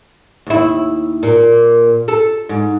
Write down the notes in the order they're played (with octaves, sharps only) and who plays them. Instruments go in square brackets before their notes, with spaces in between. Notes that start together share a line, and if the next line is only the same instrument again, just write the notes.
[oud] D#2 E4
A#2
A4
G#2